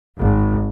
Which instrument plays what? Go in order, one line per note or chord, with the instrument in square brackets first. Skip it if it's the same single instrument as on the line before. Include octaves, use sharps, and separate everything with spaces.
[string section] G#1